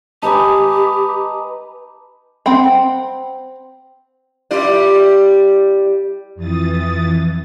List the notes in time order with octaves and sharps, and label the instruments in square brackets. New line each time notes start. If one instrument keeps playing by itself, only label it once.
[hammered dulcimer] D#4 B4 G#5 [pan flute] G4 [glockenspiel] A5 D6
[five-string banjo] C4 F#5 G5 B5
[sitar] G3 E4 D5
[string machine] F2 E3 D#6 A6